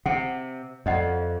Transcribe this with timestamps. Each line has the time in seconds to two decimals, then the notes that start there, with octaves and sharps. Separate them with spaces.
0.06 C3 F#5
0.86 F2 D5 D#5 F#5